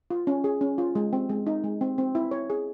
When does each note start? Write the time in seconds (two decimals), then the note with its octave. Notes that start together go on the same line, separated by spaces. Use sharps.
0.10 F4
0.27 C#4
0.44 G#4
0.61 C#4
0.78 F4
0.95 G#3
1.13 C4
1.29 G#3
1.47 D#4
1.64 G#3
1.81 C4
1.98 C4
2.15 E4
2.31 C#5
2.50 G#4